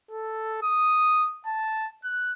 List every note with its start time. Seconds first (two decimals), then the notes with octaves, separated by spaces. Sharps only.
0.11 A4
0.62 D#6
1.46 A5
2.04 F#6